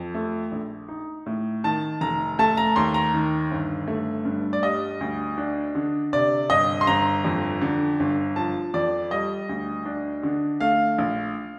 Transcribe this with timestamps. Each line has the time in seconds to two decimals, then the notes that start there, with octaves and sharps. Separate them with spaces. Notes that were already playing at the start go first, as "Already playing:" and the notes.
Already playing: F2
0.15 A3
0.52 A#1
0.89 D#4
1.26 A2
1.64 D#3 A5
2.01 F1 A#5
2.39 A3 A5
2.57 A#5
2.76 D#2 C6
2.94 A#5
3.14 D#3
3.51 G1
3.88 A3
4.25 G2
4.53 D5
4.62 G3 D#5
5.01 D2
5.38 D4
5.75 D3
6.13 C3 D5
6.50 G1 D#5
6.81 C6
6.87 G1 A#5
7.24 F2
7.61 D3
8.00 G1
8.36 F3 A5
8.74 F2 D5
9.11 G3 D#5
9.49 D2
9.86 D4
10.23 D3
10.60 A3 F5
10.99 A#1